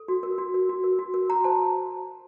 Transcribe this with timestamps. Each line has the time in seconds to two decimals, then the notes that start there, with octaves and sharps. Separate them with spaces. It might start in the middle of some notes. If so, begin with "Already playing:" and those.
Already playing: A4
0.08 F#4
0.23 A#4
0.38 F#4
0.54 A#4
0.69 F#4
0.84 A#4
0.99 F#4
1.14 A#4
1.30 F#4 A#5
1.44 C5 A5